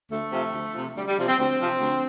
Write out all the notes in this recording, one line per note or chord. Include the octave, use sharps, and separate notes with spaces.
D2 A3
C3 F3
D2
C3 F3
D2 G3
G3
C3 F3
C4
D2 C4
C3 F3
D2